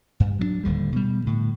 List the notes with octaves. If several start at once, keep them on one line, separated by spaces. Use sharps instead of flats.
G2
F#3 A#3 D4
D1 D#2 D3 G3
B2 G3
A2 D3